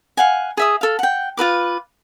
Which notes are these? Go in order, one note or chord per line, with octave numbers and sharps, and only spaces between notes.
F5 F#5 G#5
G#4 E5 D#6
A4 F5
F#5 G5
F4 F#4 B4 D6